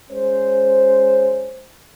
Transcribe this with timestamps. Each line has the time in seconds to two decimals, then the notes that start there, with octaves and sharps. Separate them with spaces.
0.11 G#3 C#4 C5